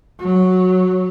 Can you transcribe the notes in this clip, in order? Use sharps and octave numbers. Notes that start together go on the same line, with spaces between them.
F#3